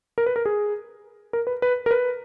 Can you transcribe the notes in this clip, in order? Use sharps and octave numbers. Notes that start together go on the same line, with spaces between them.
A#4
B4
A#4
G#4
A#4
B4
B4
A#4
B4